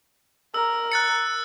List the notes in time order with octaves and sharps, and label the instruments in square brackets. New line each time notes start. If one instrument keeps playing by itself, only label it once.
[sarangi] A#4 [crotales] E6
[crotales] F#6 A6 C#7